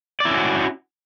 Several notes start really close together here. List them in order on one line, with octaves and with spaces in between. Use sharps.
D5 E4 C#4 F#4